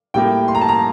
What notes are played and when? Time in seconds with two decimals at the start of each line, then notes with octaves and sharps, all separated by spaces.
0.14 A2 G3 A#3 G5
0.48 C6
0.55 A#5
0.61 A5
0.69 A#5